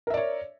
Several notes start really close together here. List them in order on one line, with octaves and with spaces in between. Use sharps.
A#4 E5 D5 C#5